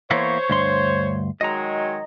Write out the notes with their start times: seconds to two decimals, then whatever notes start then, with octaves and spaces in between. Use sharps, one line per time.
0.11 E3 A#3 B3 C5 C#5
0.50 D2 G2 C6
1.41 D#3 F#3 G#3 D#5 A#5